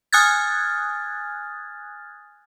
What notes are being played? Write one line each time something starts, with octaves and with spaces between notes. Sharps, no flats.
G#5 D#6 F6 F#6 G#6 A6